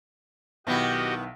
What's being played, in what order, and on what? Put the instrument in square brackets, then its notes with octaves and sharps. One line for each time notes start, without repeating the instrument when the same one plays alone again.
[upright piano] B1 [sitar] D#3 B3 E4 [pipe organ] F#4 G4 D#5